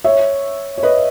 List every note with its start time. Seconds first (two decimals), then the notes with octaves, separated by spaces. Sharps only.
0.04 C#5 E5
0.78 C#5
0.83 B4 D#5